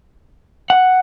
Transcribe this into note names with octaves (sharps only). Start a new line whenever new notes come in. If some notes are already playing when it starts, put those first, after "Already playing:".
F#5